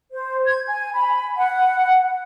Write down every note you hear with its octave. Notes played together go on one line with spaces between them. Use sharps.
C5
G#6
G#5
B5
F#5